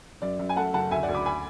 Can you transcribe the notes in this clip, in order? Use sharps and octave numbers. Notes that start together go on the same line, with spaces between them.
F#2 D5
F#2
G#5
A3 F#5 A5
F#1 F#5 A5
D2 E5 G#5
D5 F#5
D2
B5 D6
G#5 B5